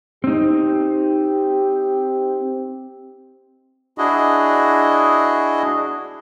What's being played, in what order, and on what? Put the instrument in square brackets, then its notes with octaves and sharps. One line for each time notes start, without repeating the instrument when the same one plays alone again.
[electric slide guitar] C4 D#4 [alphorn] G4
[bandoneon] D4 E4 F#4 G#4 D#5